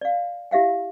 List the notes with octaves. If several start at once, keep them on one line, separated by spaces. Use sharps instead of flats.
D5 F5
E4 G4 E5 F5 G5